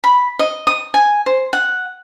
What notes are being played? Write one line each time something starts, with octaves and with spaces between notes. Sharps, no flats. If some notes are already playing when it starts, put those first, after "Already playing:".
B5
D#5
D#6
G#5
C5
F#5